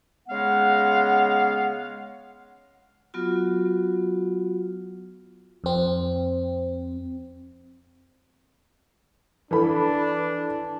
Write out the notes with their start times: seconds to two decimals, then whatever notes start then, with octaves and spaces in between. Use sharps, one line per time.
0.28 C#3 G#3 B3 F5 F#5
3.14 F#3 B3 F4 F#4
5.64 F2 C4
9.51 E3 D4 A4 B5